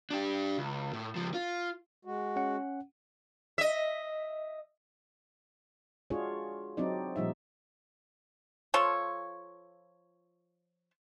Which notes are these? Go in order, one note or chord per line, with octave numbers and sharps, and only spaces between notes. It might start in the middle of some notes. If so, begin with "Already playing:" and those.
D4 G4
C#2
A2
C#2 F3
F4
G#3 F#4
C#4 F#5
D#5 E5
G#3 D4 F4 F#4 G#4 C#5
F#3 C4 D4 D#4 D5
A#2 F3 G3 D#4 E5
F3 F4 A4 C#5